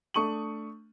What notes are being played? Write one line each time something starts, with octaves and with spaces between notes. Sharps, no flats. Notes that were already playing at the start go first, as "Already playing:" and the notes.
A3 D4 C#6 D#6 D#7 F#7